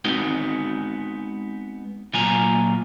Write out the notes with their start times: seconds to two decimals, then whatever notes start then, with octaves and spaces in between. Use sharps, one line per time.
0.05 G#3 B3 C4 D#4 F#4
2.14 A#2 F#3 A#3 F4 G#5 A#5